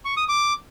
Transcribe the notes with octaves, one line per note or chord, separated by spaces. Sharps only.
C#6
D#6
D6